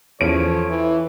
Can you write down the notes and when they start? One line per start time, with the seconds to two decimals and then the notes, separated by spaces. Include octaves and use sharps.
0.21 E2 F3 C#4 A4 C#5 D7
0.69 E3